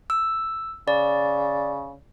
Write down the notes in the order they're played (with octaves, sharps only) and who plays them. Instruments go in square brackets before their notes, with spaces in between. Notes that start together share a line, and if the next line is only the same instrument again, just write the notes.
[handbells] E6
[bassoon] C#3 [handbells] D5